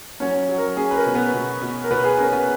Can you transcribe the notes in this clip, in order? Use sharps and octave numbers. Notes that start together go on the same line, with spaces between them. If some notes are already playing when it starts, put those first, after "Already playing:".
F#3 C#4 C#5
F#3
A#4
C#4 G#4
B4
A#4
B2
B3 B4
B2
B2
A#4
B2 B3 B4
G#4
C#4 A#4
B3 B4